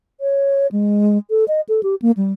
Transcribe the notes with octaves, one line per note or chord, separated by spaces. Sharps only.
C#5
G#3
A4
D#5
A4
G4
A#3
G3